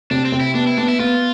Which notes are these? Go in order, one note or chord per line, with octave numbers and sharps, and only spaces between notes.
C3 D4
C4
C3
E4
B3 D4
E4
B3 D4
E4
B3 F4